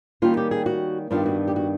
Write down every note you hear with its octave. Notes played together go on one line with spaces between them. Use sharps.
D#3 G3 A#3 C#4 F4
G4
G#4
F#4
G2 D#3 G3 B3 D4 F4
F#4
G4
F#4